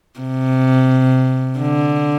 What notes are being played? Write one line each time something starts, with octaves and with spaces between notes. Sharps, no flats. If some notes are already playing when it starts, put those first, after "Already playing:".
C3
D3